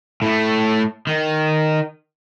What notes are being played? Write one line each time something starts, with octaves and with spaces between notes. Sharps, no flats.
A2 A3
D#3